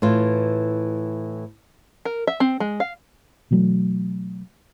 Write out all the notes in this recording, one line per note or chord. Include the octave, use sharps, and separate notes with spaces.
A2 E3 F4
A#4
E5
C4
G#3
F5
B2 E3 F#3 A3